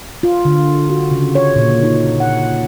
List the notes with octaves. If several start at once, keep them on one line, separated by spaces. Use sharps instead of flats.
F4
D3
F#4
C#3
C#5
A#2
D#4
F#5